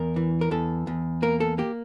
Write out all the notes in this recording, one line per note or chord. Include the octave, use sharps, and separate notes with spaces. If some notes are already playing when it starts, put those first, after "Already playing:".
Already playing: E2 A#4
E3
A#4
E2 A4
E2
A#3 A#4
A4
A#3 G4